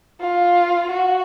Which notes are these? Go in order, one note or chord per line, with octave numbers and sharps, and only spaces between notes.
F4
F#4